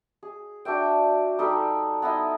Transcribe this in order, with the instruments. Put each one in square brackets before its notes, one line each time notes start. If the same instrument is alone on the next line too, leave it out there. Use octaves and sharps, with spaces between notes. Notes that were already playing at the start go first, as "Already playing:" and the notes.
[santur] G#4
D4 F#4 E5 G5
G3 D#4 A4 B4
B3 D#4 E4 D#5